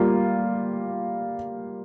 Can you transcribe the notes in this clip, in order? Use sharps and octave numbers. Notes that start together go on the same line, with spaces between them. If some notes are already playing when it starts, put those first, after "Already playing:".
Already playing: G3 A#3 F4